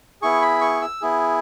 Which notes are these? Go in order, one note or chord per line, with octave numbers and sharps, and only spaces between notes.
B3 E4 G#4 C#6
B5
C#6
E6
B3 E4 G#4